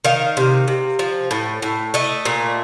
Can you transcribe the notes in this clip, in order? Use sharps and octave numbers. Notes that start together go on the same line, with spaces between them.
D#3 F5
C3
C3
F3
A2
A2
A3 D#5
A#2